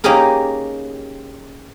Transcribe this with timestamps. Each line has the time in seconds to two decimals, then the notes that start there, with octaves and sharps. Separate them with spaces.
0.04 A#3 C#4 D#4 G4 G#4 A#4